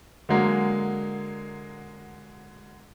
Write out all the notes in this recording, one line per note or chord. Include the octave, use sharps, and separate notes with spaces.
D3 F#3 G#3 A#3